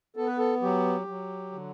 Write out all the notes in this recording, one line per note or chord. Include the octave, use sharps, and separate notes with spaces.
B3 A4
B4
A4
F#3 G4
F#3
D3